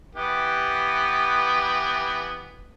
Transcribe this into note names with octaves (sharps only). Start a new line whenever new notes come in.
E3 B3 G4